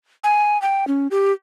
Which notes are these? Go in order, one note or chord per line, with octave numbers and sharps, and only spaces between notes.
G#5
G5
C#4
G4